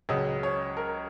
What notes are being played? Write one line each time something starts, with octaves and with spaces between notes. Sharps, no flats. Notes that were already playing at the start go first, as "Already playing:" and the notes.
C#2 C#3 F#3 D#5
C#5
A#4